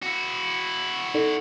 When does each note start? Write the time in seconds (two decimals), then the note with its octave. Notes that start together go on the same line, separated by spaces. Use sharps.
0.02 E4 F#4
1.14 D#4 A4 D5